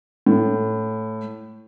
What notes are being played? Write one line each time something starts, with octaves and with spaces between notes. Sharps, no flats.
A2